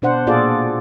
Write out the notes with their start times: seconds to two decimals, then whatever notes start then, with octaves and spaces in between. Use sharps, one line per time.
0.02 B2 D4 C5 F#5
0.27 A#2 F4 G#4 A4 D5